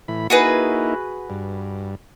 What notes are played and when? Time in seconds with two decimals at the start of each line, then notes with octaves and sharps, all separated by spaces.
0.08 A2 E3 B5
0.30 A#3 D#4 E4 F#4 G#4 B4
1.30 G2